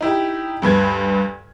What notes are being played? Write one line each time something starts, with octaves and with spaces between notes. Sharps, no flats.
D#4 E4 G4
D2 G2 B4 G#6